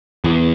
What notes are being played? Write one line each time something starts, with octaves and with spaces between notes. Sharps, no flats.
E2